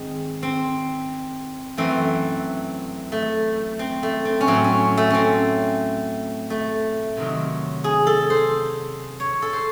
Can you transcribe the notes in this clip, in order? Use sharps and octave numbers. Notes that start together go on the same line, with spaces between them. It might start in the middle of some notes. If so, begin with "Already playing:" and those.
Already playing: G#2 D#3 G#3 C4
C4
F#2 E3 A3 C4
A3
C4
A3
C4
C#4
A2 F#3 A3 C4
C#4
A3
C4 C#4
A3
C3 D#3 F#3
G#4
A4
C5
C#5
A4
C5